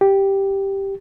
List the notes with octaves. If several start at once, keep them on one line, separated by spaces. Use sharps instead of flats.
G4